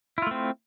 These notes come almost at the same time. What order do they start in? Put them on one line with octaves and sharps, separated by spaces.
E4 F4 A3 C4